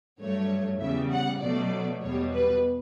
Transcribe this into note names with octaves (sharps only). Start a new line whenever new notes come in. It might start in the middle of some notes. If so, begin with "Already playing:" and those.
G2 F#3 A3 C#5
E2 C#3 G3 E5
F#5
B2 F#3 A3 D5
E2 B2 G3 C#5
B4